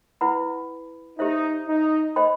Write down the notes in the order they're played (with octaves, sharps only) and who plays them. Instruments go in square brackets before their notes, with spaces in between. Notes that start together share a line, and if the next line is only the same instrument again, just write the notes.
[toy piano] E4 B4 F#5 B5
[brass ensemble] D#4 [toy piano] G4 C5 E5
[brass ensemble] D#4
[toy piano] C5 D#5 G5 B5